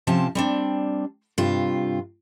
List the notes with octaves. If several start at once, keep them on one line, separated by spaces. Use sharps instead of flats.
C3 F3 C4 C#4 A5
G3 C4 D4
G2 C3 F4